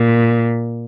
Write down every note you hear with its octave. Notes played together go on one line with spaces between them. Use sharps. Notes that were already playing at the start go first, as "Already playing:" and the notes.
Already playing: A#2